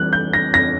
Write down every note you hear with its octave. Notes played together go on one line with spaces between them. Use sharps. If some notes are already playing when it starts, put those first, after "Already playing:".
Already playing: E3 G3 F#6
G6
A#6
A#6